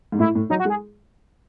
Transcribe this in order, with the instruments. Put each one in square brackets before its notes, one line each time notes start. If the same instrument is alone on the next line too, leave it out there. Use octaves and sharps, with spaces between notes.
[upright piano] G#2
[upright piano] A2 [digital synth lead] E4
[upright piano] A2
[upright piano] F#3 [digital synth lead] D#4
[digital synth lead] F#4
[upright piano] G#3
[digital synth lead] G#4